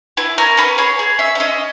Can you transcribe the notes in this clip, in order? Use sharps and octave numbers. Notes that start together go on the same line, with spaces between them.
E4 B4
C#4 A#4
C#4 B4
G#4 C#5
G#4
C#4 E5
E5
C#4 D#5